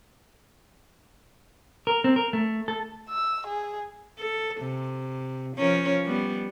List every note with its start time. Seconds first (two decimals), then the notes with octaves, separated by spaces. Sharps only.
1.87 A#4
2.04 C4
2.16 A#4
2.33 A3
2.68 A4
3.10 E6
3.47 G#4
4.19 A4
4.61 C3
5.57 F3 C#4 A#4
6.06 G3 B3